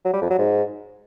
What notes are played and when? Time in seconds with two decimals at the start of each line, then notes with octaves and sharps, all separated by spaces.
0.05 F#3
0.13 G3
0.22 F2
0.30 F#3
0.38 G#2